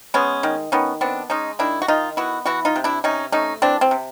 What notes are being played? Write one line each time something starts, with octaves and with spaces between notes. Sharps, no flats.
G#3 B3 C#4
D#3
D#3 B3 C#4
B3 C4 D4
G#3 C#4 D#4
D#3 D4 E4
F#4
D#3 D#4 F4
B3 E4 F#4
E3 E4 F#4
D#4 F4
C3
D4 E4
C3 C#4 D#4
A3 C#4 D#4
E3 C4 D4
C4
C3